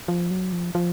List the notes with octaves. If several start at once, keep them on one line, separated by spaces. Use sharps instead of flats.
F3
F#3
F3
F3